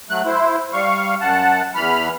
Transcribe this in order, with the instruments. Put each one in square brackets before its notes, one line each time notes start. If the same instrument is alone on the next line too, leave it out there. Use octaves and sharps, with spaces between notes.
[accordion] F#3 A3 F#6
E4 C5
G3 F5 C#6
F#2 F#5 A5
E2 E3 B5 F6